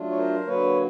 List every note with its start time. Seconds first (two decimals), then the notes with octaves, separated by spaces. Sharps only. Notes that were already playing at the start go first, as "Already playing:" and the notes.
Already playing: F#3 A3 D4 F4
0.11 C#5
0.17 A#4 C5
0.47 D3 F#3 A#3 B4 C#5